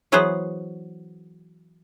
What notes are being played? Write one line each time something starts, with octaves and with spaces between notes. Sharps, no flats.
E3 F#3 B3 G#4 B4 C5